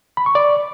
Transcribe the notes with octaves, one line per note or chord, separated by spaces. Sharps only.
B5
C#6
D5